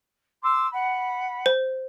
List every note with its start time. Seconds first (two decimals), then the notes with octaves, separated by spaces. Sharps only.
0.42 C6 D6 E6
0.72 F#5 B5
1.46 C5